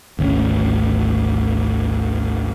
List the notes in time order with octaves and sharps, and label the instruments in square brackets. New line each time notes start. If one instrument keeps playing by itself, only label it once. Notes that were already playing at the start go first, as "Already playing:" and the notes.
[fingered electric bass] G#1 D2 B2 C#4